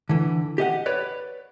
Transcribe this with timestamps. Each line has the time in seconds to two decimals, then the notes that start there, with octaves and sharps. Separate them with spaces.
0.09 D3 E3
0.58 G4 D#5 F#5
0.86 B4 C#5 D5